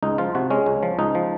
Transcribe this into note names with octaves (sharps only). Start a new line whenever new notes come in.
C#2 D#4
F3 F4
C3 F#4
G#3 C#4
C#2
F3
C#2 D#4
F3